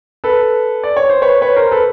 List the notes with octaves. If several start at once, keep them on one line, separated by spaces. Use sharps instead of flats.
A4 B4
D5
C#5
C5
B4 C#5
B4 C#5
A#4 C5
A4 B4